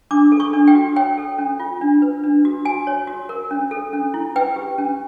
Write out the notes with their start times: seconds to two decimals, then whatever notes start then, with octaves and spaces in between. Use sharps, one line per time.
0.11 D4 D6
0.32 A4
0.40 C#6
0.53 D4
0.68 G5
0.75 F#4
0.96 C#5 G5
1.18 A4
1.39 C#4
1.60 F4
1.81 D4
2.02 B4
2.24 D4
2.45 F#4
2.65 F#4 G#5
2.87 C#5
3.07 F#4
3.29 A#4
3.51 C#4
3.71 A4
3.93 C#4
4.14 E4
4.36 B4 G5
4.56 G4
4.78 C#4